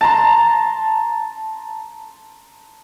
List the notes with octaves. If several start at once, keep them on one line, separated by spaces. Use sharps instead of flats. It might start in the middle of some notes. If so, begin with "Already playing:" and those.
A5 A#5 C6